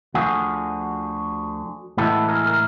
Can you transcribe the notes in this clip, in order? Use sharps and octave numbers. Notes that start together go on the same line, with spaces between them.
D2 D3 F3 F#4 G#4
A2 E3 G#3 B3 E4 G4 A4
G#4 A#4
A#4